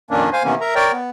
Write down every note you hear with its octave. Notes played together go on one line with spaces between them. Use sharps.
F2 A#2 D#3 A#3 C#4 D4
C5 F5 G#5
C3 D#3 E3 A#3 B3 C#4
A#4 E5 A#5
A#4 C#5 D5 G5
B3